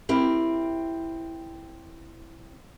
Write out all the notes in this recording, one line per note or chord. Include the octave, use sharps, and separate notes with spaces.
C4 E4 G4 A#4